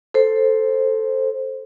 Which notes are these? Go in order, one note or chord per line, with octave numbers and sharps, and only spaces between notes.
A4 C5